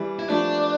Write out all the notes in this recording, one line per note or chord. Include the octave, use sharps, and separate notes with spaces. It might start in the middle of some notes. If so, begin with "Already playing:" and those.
Already playing: E3 G3
E4
F3 A3 D4